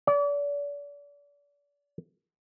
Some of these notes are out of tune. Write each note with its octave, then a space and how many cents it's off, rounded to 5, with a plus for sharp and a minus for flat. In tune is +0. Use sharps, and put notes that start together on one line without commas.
D5 -35